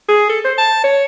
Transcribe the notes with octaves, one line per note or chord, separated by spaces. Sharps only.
G#4
A4
C5
A5
C#5